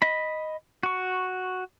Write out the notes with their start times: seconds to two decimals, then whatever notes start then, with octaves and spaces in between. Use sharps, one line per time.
0.02 D#5 B5
0.83 F#4 C#6